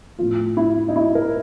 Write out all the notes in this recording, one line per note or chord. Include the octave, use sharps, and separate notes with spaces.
A2 F3 A3 F4
E4
D#4
E4
A#4